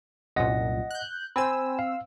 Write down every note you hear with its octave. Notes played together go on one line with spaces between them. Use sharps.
C2 F#2 A#2 D#5 F#5 A#6
F#6 G6
C4 C5 G#5 B5 E6
F5